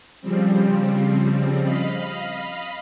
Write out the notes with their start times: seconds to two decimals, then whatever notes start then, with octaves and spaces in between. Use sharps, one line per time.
0.21 C#3 F3 G3 C4
1.64 D#5 F5 B5